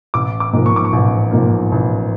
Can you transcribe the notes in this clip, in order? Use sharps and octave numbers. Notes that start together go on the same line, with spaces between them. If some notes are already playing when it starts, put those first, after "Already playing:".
A1 D6
D6
G#2 F3 A#3
C#6
D6
C#6
A1
G#2 F3 A#3
A1